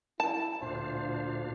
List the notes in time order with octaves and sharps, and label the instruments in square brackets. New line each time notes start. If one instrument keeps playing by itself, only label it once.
[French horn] E4 [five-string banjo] A5
[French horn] D2 [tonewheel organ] A#2 D4 F5 [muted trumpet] C5